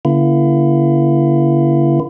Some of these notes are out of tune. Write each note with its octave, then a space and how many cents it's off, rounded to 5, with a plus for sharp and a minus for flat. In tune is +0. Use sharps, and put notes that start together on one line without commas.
D3 -40 A#3 +45 E4 +35